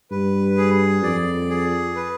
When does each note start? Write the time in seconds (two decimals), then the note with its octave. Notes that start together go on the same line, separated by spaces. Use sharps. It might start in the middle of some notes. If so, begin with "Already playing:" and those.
0.11 G2 B4
0.57 G#4
1.03 F2 D5
1.50 G#4
1.96 B4